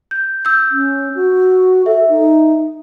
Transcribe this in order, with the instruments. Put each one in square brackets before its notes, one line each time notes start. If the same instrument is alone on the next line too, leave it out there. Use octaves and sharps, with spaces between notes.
[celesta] G6
E6 G6
[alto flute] C#4
F#4
[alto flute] A4 [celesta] E5
[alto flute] D#4